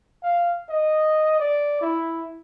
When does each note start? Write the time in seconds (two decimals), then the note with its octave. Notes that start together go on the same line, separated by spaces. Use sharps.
0.23 F5
0.69 D#5
1.40 D5
1.81 E4